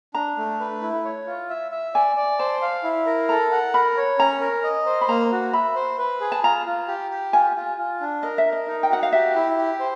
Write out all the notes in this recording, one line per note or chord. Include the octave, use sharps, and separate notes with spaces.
D4 A#5
A3
B4
E4
C#5
F4
E5
E5
D5 G#5
D5
C5 A5
F5
E4
A#4
A4 A#5
F#5
A#4 B5
C#5
C#4 A#5
A#4
D#5
C5
B5
A#3 A#5
F#4
E5 B5
C5
B4
G#4
A5
F4 A#5
F4
G4
G4
F4 G#5
F4
F4
D4
A#4 D#5
E5
A#4
D#5
D#4
G5
F#4 F#5
F5
G4 E5
E4
G4
C5